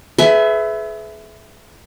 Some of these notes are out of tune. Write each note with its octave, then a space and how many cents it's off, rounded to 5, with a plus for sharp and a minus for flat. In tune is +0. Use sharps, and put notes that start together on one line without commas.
G#4 +40 B4 +25 E5 +0